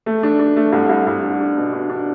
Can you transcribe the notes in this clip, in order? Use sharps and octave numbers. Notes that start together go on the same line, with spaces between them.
A3
D4
D4
A3
C2
C2
C2
D4
D4
B2
D4
D4